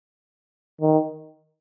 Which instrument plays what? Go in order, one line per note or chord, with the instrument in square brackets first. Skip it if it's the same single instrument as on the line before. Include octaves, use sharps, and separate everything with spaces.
[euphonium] D#3